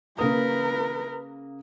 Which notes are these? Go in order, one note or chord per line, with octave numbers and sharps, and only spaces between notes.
C#3 A#3 A#4 B4 D#6